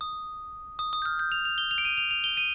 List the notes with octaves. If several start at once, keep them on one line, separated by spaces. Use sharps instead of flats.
D#6
D#6
D#6
G6
F6
G6
F7
F7
G7
F7
D7
D#7
F7
F7
G7
D#7